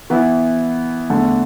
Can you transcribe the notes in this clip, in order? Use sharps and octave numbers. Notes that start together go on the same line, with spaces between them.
E3 B3 E4
E2 D3 A3